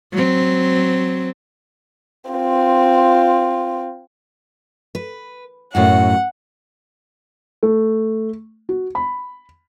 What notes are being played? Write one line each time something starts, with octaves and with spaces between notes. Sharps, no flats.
F#3 C4
C4 F4
B4
F#2 A2 F#4 F#5
A3
F#4
B5